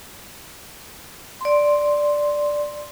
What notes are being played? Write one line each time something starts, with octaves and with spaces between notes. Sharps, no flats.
D5 C6